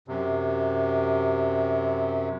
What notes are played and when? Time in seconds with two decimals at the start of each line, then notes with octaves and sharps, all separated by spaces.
0.08 F#2 C3